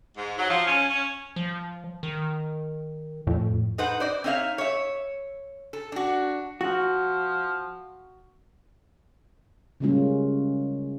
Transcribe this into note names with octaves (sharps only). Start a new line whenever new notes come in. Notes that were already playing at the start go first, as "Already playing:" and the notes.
G#2
F#3
F3
C#4
C#4
F3
D#3
F2 A2
D#4 B4 C5 F#5
C5 D5 D#5
C4 D#4 C#5 E5 F5
C#5 E5
A4
D4 F#4
F3 F#4
C#3 G3 G#3 A#3 C#4 F4